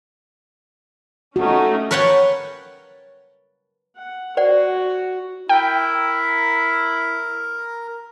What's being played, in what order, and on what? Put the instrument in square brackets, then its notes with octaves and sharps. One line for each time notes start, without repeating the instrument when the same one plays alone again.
[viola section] A3 C#4 D#4 [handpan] F#4
[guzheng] A#4 B4 C#5 F#5 G5 A5
[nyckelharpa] F#5
[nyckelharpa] F#4 [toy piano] C5 D5 F#5
[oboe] E4 [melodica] A#4 [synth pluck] G5